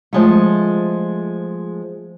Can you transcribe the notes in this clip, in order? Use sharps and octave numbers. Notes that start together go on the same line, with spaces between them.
F3 G#3 A3